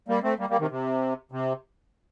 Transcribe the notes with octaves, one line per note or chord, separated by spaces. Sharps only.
G3 A#3
A3 C4
G3 A#3
G3 A#3
C3 D#3
C3
C3